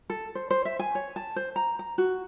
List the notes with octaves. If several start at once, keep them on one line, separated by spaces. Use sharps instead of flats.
A4
C5
C5
E5
G#5
C#5
A5
C5
A#5
A#5
F#4